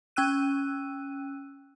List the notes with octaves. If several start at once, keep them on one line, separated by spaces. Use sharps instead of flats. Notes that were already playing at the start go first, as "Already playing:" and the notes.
C#4 G5 E6 F#6 D#7